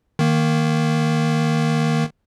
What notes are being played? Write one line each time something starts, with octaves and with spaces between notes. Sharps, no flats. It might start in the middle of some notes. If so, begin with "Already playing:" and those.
D#3 A#3